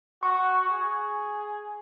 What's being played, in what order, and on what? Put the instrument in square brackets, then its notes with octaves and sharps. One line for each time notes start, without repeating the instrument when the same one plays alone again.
[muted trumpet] F#4 [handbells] C#6
[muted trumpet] G#4